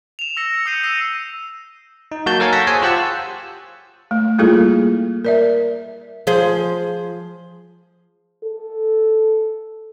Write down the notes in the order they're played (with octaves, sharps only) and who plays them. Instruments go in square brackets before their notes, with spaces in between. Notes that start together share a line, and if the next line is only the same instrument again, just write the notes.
[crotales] E7 F7
E6 A#6 C#7
E6 C#7
D#6 E6 G6 C7 C#7 D#7
E6 A#6 C7 D#7 E7
[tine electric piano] D#4
F#3 A#3 F#4 C#5 A5 G6
A4 A#4 C#5 F5 G#5
F#5 A5 E6 A#6 B6
G#4 C5 C#5 G#5
F4 G4 C5 F#5 A5 E6
[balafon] A3
G3 A#3 E4 F4 G#4 A4
A#4 D5 E5
[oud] F3 G#4 C5
[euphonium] A4